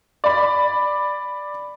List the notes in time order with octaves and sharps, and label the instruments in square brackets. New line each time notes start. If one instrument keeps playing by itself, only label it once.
[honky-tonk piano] D5 B5